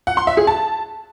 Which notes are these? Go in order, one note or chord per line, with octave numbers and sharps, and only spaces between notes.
F#5
C6
E5
G#4
A5